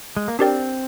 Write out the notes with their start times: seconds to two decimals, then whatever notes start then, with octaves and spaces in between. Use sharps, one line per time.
0.17 G#3
0.28 A#3
0.39 C4 D4 G4 A#4 D5 G5